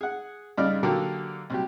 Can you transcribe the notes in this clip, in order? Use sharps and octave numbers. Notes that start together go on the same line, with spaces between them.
G#4 F#5
G2 C#3 D#4 D5 D#5 F6
D3 F#3 A#3 G4 A4 A#4
C2 F#3 G4